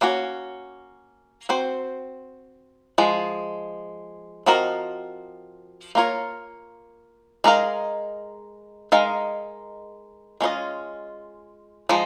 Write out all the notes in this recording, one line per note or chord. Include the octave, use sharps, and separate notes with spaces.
A#3 C#4 F#4 C#5
C4 F#4 C5
F3 G#3
F3 C4 F#4 A#4 D#5
A#3 F4 A#4 C#5
G#3 D#4 A#4 F5
G#3 D#4 A#4 F5
G#3 C#4 F4 C5 D#5
F3 G#3 D#4